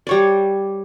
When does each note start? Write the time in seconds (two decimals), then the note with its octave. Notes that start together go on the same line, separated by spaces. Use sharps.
0.07 G3 C#5 D5